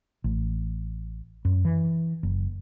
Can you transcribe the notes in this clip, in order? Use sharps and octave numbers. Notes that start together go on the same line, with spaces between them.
A1
F#2
E3
F#1